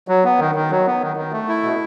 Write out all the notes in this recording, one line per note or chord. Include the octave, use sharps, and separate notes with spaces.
F#3
B3
D#3
D#3
F#3
B3
D#3
D#3
A3
E4
B2